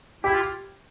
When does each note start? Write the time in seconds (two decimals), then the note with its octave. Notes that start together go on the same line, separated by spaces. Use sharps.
0.24 E4 G4
0.34 F4